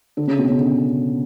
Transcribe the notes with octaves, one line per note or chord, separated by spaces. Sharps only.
D3
C#3
B2
C#3
D3